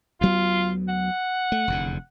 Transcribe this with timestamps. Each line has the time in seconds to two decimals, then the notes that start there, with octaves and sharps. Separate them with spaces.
0.21 D2 F#3 B3 F4
0.89 F#5
1.52 A3
1.68 F1 E2 D3